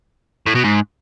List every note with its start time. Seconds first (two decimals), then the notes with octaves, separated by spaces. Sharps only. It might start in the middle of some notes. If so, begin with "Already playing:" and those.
0.47 A2
0.55 B2
0.64 G#2